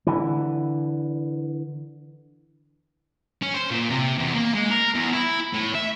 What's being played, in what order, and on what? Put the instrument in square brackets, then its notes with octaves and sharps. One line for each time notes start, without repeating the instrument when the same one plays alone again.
[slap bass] D3 E3
[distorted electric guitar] C#4
C5
A#2
C3
E2
A#3
G#3
A#4
E2
E4
A2
E5